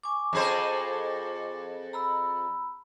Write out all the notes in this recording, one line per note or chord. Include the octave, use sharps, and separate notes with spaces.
G#5 C#6 D6
F2 G#4 C5
A#5 B5 E6